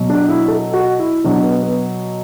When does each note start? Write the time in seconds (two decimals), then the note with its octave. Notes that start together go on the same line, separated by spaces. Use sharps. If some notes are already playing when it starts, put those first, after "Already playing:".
Already playing: B2 F#3
0.10 D4
0.29 E4
0.48 A4
0.74 F#4
0.99 E4
1.24 B2 F#3 D4
1.43 B3
1.63 B3